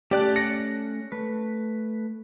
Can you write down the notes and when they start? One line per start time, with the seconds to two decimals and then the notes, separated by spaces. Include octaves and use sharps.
0.11 A3 C#4 G4 D5 A5 F#6
0.36 A#6 C#7
1.12 A3 B4